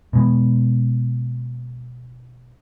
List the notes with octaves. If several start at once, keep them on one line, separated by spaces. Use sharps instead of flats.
B2 G#3 B3